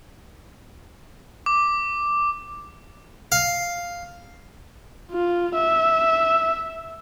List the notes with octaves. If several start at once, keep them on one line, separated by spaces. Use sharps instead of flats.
D6
F5
F4
E5